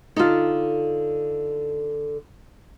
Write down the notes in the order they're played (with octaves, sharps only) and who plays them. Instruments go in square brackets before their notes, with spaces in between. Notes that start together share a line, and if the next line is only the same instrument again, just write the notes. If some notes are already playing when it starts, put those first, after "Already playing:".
[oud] D3 A4 [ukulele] D#4 F4